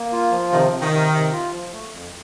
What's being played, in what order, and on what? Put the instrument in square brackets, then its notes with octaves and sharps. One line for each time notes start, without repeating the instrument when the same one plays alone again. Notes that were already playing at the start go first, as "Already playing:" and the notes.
Already playing: [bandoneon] A#3
F4
F3
[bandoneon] C3 [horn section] D#3
[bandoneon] C3
[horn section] D#3
[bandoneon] C3
C3
F4
F3
A3
F2